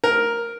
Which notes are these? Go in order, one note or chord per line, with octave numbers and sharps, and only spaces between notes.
A#4